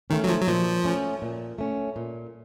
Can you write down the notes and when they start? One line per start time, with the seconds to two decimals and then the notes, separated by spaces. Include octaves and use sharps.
0.10 D#3 A3 C#4
0.24 F#3
0.28 F3
0.41 F#3
0.48 A#2 F3
0.84 A3 C#4
1.22 A#2
1.59 A3 C#4
1.96 A#2